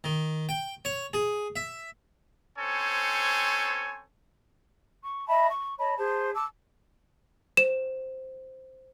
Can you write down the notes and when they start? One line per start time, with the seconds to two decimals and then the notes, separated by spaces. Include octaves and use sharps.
0.04 D#3
0.49 G5
0.85 C#5
1.13 G#4
1.56 E5
2.58 C4 C#4 A4 C5 C#5 G#5
5.04 C#6
5.29 D#5 E5 A5 B5
5.49 C#6
5.78 C#5 D#5 A5 B5
5.97 G#4 C5 A5
6.35 A5 D6 E6
7.57 C5 E7